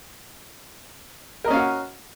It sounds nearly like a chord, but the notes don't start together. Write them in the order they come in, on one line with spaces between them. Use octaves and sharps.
A#4 D#5 C#4 F5 F#4